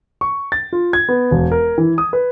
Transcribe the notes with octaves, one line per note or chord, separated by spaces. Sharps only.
C#6
A6
F4
G#6
B3
E1
A#4
E3
D#6
B4